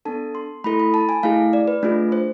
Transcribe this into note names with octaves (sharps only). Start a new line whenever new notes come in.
B3 D4 A4 A5
C6
A3 E4 A4 B5
B5
A5
G#5
A3 E4 G#4 F5
D5
B4
A3 D4 F4 G#4
C5